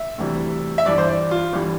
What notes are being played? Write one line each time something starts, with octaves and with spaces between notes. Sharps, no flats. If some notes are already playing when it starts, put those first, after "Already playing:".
Already playing: E5
D2 C3 E3 G3
E5
G1 G2 E3 G3 D5
C5
D5
F4
G1 E3 G3